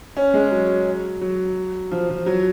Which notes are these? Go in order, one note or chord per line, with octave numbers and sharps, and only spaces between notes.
C#4
G#3
F#3
F#3
F3
F3
F#3